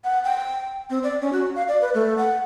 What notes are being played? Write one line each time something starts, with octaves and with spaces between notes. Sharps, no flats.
F#5
G5
C4
D5
C#4
F#4
F5
D5
B4
A3
F#5